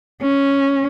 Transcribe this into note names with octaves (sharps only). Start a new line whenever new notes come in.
C#4